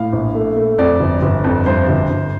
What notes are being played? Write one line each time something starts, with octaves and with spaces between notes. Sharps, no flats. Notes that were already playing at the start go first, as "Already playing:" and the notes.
Already playing: A2 F5
A#1
A3
A3
F2 D5
G1
G1
F2
G2 C5
G1
G1